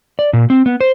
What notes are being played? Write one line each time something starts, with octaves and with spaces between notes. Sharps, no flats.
D5
A#2
C4
B3
C5